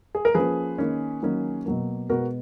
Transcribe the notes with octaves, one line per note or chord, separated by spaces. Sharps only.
G#4
A#4
F3 A#3 C#4 G#4 B4
D#3 A#3 C#4
D#3 F#3 A#3 C#4
B2 F#3 A#3
B2 G#3 B3 F#4 A#4